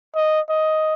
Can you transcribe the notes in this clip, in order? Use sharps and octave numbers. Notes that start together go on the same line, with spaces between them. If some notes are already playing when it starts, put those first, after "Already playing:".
D#5
D#5